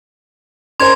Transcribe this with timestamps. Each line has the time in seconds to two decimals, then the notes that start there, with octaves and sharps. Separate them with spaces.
0.80 C#4 A#4 C5 C6 G#6